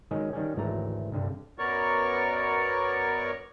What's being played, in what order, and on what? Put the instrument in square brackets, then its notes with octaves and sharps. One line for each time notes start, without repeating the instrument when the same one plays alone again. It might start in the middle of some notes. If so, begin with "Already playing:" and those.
[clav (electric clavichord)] D#3 F#3 G#3 C#4 G#4
D#3 G3 C#4
G#1 D2 E3 F#3 A3 A#5
C2 G2 D3
[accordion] F#2 B3 A#4 C#5 D5 C#6